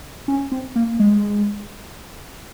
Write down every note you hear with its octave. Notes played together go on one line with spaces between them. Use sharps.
C#4
C4
A#3
G#3